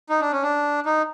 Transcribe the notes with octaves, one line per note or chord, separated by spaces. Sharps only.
D#4
D4
C#4
D4
D#4